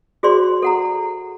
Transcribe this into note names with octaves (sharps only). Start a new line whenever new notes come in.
F#4 G#4 C5 D5 C6
A4 F#5 A#5